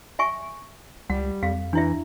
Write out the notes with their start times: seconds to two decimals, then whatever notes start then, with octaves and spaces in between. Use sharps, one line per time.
0.19 E5 G#5 C#6
1.10 C#2 G3 F#5
1.43 F2 F5
1.73 E3 D4 E4 E5